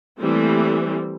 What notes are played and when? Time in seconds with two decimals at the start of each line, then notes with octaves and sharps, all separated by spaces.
0.19 E3 G3 A3 A#3 C4